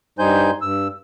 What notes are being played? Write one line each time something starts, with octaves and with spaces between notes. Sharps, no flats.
G2 G3 D#4 C5 G#5 G6
G2 E6